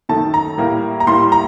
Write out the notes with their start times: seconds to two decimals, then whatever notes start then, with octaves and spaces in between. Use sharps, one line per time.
0.09 F#2 D#3 A3 A5
0.34 A#5
0.58 A2 G3 A#3
1.00 A#5
1.07 A2 G3 A#3 C6
1.32 A#5